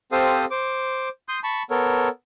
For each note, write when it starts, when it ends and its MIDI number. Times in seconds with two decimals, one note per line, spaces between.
0.12 0.45 60
0.12 0.45 67
0.12 0.45 69
0.12 0.45 72
0.12 0.45 77
0.12 0.45 87
0.51 1.09 72
0.51 1.09 86
1.29 1.40 84
1.29 1.40 87
1.29 1.40 91
1.44 1.63 81
1.44 1.63 83
1.44 1.63 85
1.70 2.09 59
1.70 2.09 69
1.70 2.09 70
1.70 2.09 73